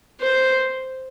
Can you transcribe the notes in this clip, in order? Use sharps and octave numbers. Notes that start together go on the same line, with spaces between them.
C5